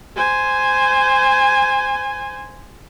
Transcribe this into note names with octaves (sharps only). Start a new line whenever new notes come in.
C5 G#5